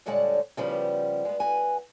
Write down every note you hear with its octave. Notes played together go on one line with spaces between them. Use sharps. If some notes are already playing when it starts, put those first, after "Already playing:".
A#2 D3 G3 G#3 C#5 F#5
C#3 F3 G3 B3 G4
G#3 B3
F#4 G#4 B4 G#5